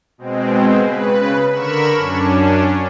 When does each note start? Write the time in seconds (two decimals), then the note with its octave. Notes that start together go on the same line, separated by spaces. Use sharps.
0.18 B2 G#3 C4
0.82 C#3 B4
1.52 D3 A#4 B5 C#6 E7
1.95 F#2 C#4 D4